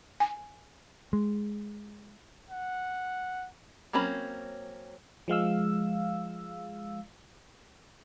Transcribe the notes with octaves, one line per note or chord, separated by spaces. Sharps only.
G#5
G#3
F#5
F#3 A#3 C4 C#4 B5
F3 G#3 F5 E6